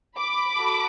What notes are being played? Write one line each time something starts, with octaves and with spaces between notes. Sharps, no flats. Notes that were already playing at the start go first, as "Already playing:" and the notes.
B5 D6
F#4 A4